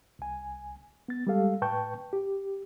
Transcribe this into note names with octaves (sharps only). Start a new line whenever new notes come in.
C2 G#5
B3 A6
G3 G#3 G4 A4 F5
A2 B4 G5 A5 C#6 G6
G4